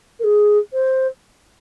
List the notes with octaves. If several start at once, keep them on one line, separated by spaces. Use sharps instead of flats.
A#4
G#4
C5